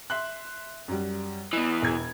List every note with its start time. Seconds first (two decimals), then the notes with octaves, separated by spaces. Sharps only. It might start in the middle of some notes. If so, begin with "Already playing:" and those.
0.10 E5 C6 F#6
0.88 F#2 G3
1.53 E2 E3 D#5
1.82 E1 G#6